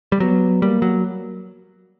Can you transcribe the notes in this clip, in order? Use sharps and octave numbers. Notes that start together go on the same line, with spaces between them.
G3
F#3 B3
G3 A#3
F#3